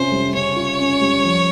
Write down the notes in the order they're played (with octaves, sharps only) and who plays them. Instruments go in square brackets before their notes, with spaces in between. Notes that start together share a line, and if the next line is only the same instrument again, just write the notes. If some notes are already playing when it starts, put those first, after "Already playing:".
Already playing: [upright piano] C3 C#4 F4 [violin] C5
[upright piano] G3
[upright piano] C#3 [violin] C#5
[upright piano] F4
C#4
G3
F3